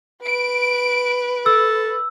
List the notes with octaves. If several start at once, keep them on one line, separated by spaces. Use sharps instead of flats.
B4 D7
A4 E6